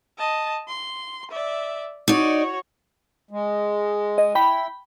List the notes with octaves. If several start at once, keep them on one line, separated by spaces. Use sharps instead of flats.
D#5 A5
C6
D5 E5
D#4 F#4 C#5 D5
G#3
D#5
E4 G5 B5